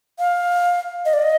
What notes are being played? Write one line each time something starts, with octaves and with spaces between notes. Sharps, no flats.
F5
D#5
D5
D#5